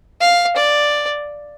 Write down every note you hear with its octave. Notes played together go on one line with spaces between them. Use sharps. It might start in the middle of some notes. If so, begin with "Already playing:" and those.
F5
D5